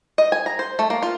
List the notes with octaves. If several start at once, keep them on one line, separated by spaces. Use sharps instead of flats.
D#5
G#5
A#5
C5
A3
A#3
F4